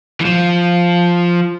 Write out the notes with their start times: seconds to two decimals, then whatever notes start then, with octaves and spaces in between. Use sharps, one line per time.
0.21 E3
0.25 F3